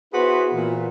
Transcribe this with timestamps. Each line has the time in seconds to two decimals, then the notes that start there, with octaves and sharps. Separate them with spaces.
0.13 B3 E4 F#4 G#4 B4 C5
0.53 A#2 E3